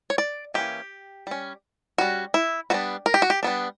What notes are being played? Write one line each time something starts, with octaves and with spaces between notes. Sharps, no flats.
C#5
D5
E3 A#3 C#4 G4
G3 C#4
G3 C#4 F#4
E4
G3 B3 D4 F#4
A#4
G4
F#4
G4
G3 B3 D4